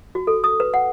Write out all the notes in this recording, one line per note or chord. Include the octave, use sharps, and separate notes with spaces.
F#4
A4
D#6
B4
F#5